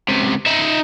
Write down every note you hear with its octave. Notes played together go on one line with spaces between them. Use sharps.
C#2 C3
D#4 E5